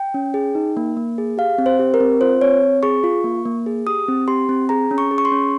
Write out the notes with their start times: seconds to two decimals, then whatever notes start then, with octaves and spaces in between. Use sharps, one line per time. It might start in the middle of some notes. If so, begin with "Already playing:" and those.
Already playing: G5
0.14 C#4
0.34 G#4
0.55 D#4
0.77 A#3
0.97 A#3
1.18 G#4
1.38 G4 F5
1.58 C4
1.66 C5
1.79 G4
1.94 A#4
2.01 C4
2.21 F4 C5
2.41 C4 C#5
2.63 C4
2.83 G#4 C#6
3.04 F4
3.24 A#3
3.45 A#3
3.66 G#4
3.87 G4 D#6
4.08 C4
4.28 G4 C6
4.49 C4
4.69 G#4 A#5
4.91 C#4
4.98 C#6
5.11 G#4
5.18 C#6
5.25 C6
5.32 C#4